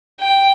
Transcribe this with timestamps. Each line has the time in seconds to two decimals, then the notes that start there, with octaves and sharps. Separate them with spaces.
0.20 G5